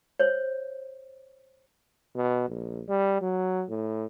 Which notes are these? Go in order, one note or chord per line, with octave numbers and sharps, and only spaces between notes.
C5 C#5
B2
A#1
G3
F#3
A2